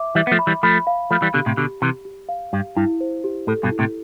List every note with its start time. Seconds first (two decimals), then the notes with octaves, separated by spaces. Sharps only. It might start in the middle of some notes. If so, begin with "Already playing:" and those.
Already playing: E5 D6
0.15 E3 G3 E5
0.27 B3
0.31 F3 A3
0.39 B5
0.47 E3 G3
0.63 F3 A3 B5
0.87 F5
1.10 F3 A3 B5
1.22 E3 G3
1.34 B2 D3 G4
1.46 A2 C3
1.57 B2 D3 G4
1.82 C3 E3 G4
2.05 G4
2.29 F5
2.53 G2 G4
2.77 G2 E4
3.01 C5
3.24 G4
3.47 A2 A4
3.63 G2 B2
3.72 E4
3.79 A2 C3